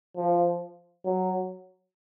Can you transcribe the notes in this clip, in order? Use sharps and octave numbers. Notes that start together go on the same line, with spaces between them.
F3
F#3